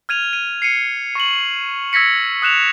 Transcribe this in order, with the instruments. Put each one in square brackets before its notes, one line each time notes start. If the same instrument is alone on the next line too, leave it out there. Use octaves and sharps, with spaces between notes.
[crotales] F6 G#6 D#7 F7
D#7
C7 C#7 D#7
C#6 C#7 F#7
E6 G#6 A#6 B6 C#7
D#6 F#6 E7 F7